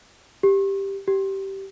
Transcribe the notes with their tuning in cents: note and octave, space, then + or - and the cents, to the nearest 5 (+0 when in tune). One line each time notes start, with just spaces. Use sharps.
G4 +5
G4 -15